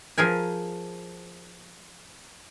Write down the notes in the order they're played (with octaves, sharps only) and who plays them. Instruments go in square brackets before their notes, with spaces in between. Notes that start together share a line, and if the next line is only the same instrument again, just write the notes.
[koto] F3 G#4 A#4 G#5